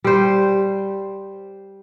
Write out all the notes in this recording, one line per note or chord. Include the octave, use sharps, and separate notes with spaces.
G3 C5